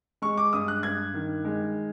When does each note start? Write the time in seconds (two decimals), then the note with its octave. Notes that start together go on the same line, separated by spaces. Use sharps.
0.22 G#3 C#6
0.38 D6
0.53 G2 D#6
0.68 F#6
0.83 G2 G#6
1.14 D#3
1.45 G#3